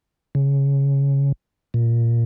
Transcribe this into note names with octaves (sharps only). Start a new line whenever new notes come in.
C#3
A#2